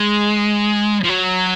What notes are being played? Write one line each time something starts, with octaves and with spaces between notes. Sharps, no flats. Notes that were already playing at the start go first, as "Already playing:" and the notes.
Already playing: G#3
F3
F#3